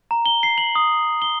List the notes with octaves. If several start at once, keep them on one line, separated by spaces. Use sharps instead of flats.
A#5
G7
C7
F#7
D#6
G7